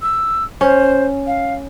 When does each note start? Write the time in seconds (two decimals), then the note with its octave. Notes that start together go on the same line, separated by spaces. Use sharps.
0.02 E6
0.61 C#4 C5
1.27 F5